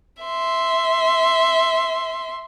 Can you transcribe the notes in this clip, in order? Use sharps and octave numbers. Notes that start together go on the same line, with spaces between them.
E5 C6